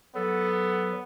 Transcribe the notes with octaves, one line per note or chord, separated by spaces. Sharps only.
F#3 B3 A4